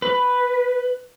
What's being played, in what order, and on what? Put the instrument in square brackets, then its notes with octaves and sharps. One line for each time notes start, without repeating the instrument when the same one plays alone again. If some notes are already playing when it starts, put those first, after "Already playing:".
[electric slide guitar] B4